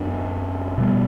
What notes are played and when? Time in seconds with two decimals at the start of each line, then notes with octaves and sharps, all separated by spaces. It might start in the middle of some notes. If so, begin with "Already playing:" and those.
Already playing: F#2 F#3 B3 D4
0.78 B2 G3 B3